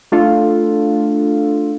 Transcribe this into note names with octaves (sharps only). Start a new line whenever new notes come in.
A3 D4 F4 A4